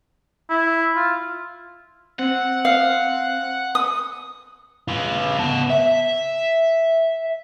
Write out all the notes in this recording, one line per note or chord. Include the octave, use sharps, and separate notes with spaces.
E4
F4
C4 F#5
F5
D#6
F4 B4
B3 A5
E5